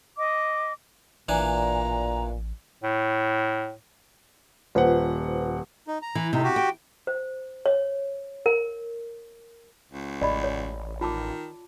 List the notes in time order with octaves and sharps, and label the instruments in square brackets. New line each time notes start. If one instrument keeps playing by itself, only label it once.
[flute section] D#5 D6
[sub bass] A1 [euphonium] A#2 [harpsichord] E3 D4 G#5 [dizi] A#5
[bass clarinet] A2
[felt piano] D#1 F#5 [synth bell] F4 B4 C5
[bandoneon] D#4
A#5
[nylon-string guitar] E3
[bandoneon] A2 D#4 [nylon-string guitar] C3
[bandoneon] F#4 G4
[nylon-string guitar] G5
[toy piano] C5
C#5
A#4
[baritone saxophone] C#2
[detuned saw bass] A1 [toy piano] D5 D#5 B5
[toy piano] C#5
[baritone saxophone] D#3 [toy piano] F4 A5 D6